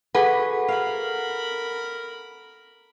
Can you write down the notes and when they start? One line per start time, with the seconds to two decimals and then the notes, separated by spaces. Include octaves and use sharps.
0.15 F#4 G#4 A4 B4 F#5
0.68 A#4 F5 B5